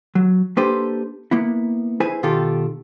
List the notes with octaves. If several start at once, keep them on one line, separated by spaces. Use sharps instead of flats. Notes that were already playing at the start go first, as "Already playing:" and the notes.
F#3
A#3 D4 G4 A4 B4 C5
A#3 B3 E4
E4 G#4 B4 C5 G#5
B2 D#3 F4 G4 A4